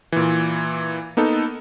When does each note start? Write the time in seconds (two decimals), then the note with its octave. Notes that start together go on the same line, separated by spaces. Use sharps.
0.12 A#2 E3
1.17 A#3 B3 D#4 A4